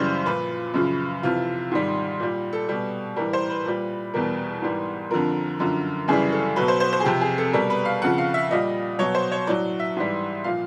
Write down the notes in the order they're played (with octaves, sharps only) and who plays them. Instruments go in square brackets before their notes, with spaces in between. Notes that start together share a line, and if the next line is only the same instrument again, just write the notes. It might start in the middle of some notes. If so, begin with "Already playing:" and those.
Already playing: [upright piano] F#2 C#3 E3 G3 C5
A#2 F3 B4
F#2 C#3 F3
F2 C3 E3 F4
G#2 D#3 G3
A#2 G3
A4
B2 G3
A2 E3 G3 A#4
C5
B4
A#2 G3
E2 B2 G3 A#4
G#2 E3 G3
F2 D3 F3 A#4
F#2 D3 F3
F#2 C#3 E3 G3 G#4
A4
B2 F#3 B4
C5
C5
C5
G#4
F2 C3 F3 G4
G#4
A4
B2 G3 A#4
B4
F5
F2 C#3 F3 F#5
F5
E5
A#2 G3 D#5
B2 F#3 C#5
C5
C#5
A2 F#3 D5
E5
G#2 E3 G3
A#2 F3 F5